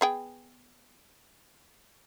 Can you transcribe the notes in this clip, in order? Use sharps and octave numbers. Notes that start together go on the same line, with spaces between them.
B3 G#4 G5